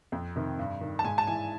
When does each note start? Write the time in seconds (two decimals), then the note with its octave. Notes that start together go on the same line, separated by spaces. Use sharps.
0.12 F2
0.36 C3 D#3
0.59 G2
0.81 D#3
0.99 A5
1.04 G#2 G#5
1.18 A5
1.27 E3 G#5